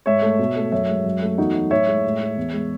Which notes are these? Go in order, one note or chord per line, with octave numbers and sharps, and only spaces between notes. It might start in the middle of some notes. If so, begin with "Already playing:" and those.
G#2 C#5 E5
A3
B2
A3
F#2 C#5 E5
G#3
F#2
A3
E2 D#4 F#4
F#3
A2 C#5 E5
G#3
A2
A3
E2
G#3